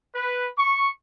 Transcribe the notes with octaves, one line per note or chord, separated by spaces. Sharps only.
B4
C#6